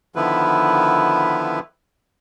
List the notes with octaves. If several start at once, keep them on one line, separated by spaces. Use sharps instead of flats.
D3 D#3 F3 B3 E4 B4